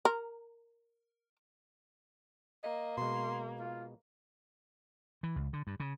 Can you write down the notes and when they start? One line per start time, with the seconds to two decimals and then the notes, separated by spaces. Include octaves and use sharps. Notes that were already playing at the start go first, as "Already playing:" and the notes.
0.05 A#4
2.63 A#3 D#5
2.97 B2 G#3 C6
3.59 F4
5.23 E3
5.36 C#2
5.53 D3
5.67 G2
5.80 C#3